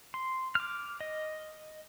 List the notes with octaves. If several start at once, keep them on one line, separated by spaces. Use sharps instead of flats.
C6
D6 F6
D#5